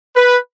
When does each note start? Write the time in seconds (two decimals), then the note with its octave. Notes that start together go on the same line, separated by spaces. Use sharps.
0.16 B4